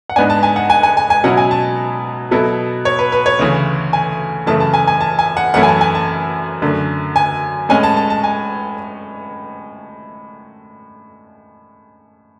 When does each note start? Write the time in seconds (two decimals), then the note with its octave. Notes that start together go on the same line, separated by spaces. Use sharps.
0.10 F#5
0.16 G#2 G#3 B3 D4 G#5
0.30 A5
0.43 G#5
0.56 F#5
0.70 G#5
0.83 G#5
0.97 G#5
1.10 G#5
1.24 B2 F#3 C#4 E4 F#5
1.37 G#5
1.51 A5
2.31 B2 F#3 B3 E4 A4
2.85 C#5
2.99 B4
3.12 B4
3.26 C#5
3.39 D2 C#3 E3
3.93 G#5
4.46 F#2 C#3 E3 A3 E4 A5
4.60 A5
4.74 G#5
4.87 G#5
5.01 A5
5.19 G#5
5.37 F#5
5.54 F#2 E3 A3 C#4 E4 F#5
5.63 G#5
5.68 A5
5.81 G#5
5.95 A5
6.62 F#2 D3 A3
7.16 G#5
7.69 A2 G#3 C#4 G#5
7.83 A5
7.97 A5
8.10 A5
8.24 G#5